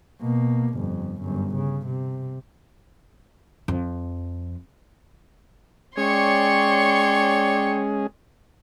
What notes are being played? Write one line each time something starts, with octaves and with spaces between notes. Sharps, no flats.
B2 A#3
G1 F2
G1 F#2
C#3
C3
F2
G#3 C#4 G#4 C#5 D5 G5 C6 C#6